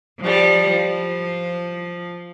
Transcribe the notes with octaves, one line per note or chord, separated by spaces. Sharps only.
F3 G3
F3